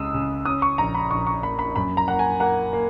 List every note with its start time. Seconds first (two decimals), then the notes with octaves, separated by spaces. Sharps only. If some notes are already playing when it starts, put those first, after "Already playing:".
Already playing: C#2 C#3 G#3 D#6 E6
0.14 C#3
0.45 C#4 D#6
0.62 C#6
0.78 A#1 A#5
0.95 B5
1.11 A#1 C#6
1.27 C#6
1.43 A#3 B5
1.59 B5
1.76 F#2 B5
1.97 A#5
2.08 A#3 F#5
2.19 G#5
2.40 A#3 F#5
2.73 A#3